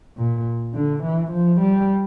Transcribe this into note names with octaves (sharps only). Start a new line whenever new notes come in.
A#2
D3
E3
F3
G3